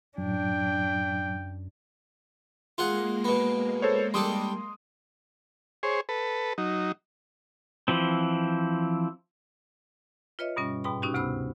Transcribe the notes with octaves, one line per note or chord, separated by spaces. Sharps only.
F#2 A2 F#3 D4 G5
G#3 A#3 F4 G#4 F#5
B2 B3
A4 C5 C#5
G3 D4 A4 C6 D#6
G#4 C5 C#5
A4 B4
F#3 D#4
E3 F3 C4
F4 B4 C#5 D#5 E5
G2 B2 G3 C#4
G#2 B2 G5 B5
C3 C#4 D#4 F#4 G4
D2 C3 B3 C5 B5 E6